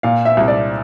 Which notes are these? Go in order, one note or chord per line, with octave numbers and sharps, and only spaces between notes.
A#2 F5
E5
C2
D5